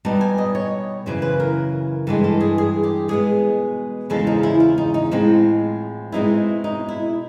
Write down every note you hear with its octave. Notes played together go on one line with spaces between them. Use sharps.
B2 G3 B3 D#4 A5
G#5
D#5
C#5
F#2 C#3 E3 C5
B4
A#4
G2 E3 G#3 A4
A4
G#4
G#4
G4
B2 G#3 B3 G#4
E2 C#3 F3 G#3 A4
D#4
E4
F4
D#4
D#4
A2 F3 G#3 C4 D#4
B2 G#3 C4 D#4 E4
D#4
E4